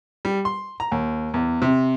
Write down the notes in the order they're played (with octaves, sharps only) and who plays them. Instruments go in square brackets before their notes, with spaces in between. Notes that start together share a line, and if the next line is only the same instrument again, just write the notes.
[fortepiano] G3
C6
A#5
D#2
E2
C3